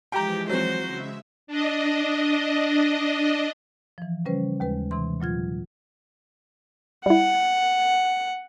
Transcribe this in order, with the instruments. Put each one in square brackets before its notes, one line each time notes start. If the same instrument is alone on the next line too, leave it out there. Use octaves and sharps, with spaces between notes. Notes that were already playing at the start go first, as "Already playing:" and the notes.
[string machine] E3 F3 G#3 [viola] G4 [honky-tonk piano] G5 A#5
[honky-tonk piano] F#3 C4 [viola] F#4 C5
[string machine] C#3 G#3 E5
D4 D#5
[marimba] E3 F3
C#3 G3 C#4 B4 C5
D#2 G#3 B4
C3 E3 C6
A#2 F#3 F4 G#6
[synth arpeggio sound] G3 E4 [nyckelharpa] F#5